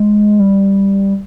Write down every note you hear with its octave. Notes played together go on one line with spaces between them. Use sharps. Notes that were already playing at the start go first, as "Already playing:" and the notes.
Already playing: G#3
G3